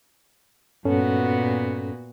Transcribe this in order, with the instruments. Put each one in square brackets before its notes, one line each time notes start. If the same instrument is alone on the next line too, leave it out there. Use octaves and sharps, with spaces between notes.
[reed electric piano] G2 C#4 A4 [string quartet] A#2 B3 F#4